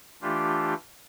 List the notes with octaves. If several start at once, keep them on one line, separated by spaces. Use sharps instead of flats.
E3 A3 D4 F4 G4